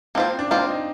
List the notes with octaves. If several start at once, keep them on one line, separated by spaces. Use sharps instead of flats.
A#3 C4 F4 C5
D4
A#3 C4 F4 C5
D#4